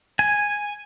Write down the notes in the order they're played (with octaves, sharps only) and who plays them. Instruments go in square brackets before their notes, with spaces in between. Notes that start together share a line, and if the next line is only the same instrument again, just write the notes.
[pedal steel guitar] G#5